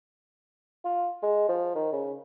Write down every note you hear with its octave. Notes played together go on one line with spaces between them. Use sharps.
F4
G#3
F3
D#3
C#3